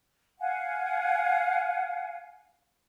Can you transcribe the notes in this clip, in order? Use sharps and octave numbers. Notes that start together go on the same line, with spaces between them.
F5 F#5 G#5